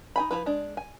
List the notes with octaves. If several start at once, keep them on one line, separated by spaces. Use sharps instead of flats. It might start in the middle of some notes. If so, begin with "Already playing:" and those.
D#4 G#5 B5
F3 A3 E4 B4
G#3 D4
G#5